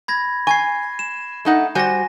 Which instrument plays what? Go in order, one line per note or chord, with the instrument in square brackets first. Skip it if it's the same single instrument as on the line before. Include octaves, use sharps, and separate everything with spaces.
[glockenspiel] B5 G#6 A#6
[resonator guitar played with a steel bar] G#5 [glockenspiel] C#6 G#6 C7
[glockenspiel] E7
[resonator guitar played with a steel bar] A3 D#4 F#5
[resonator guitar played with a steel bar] G3 F#4 C5 [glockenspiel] G#5 A#6